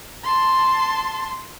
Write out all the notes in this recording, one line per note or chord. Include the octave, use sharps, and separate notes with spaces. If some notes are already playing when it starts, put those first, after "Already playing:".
A5 C6